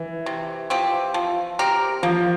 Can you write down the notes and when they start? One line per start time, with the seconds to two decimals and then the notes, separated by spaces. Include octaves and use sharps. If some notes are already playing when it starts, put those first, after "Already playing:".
Already playing: E3
0.26 C3
0.70 F3 C4 G4
1.14 F3
1.59 C4 G4 A#4
2.02 F3 A#3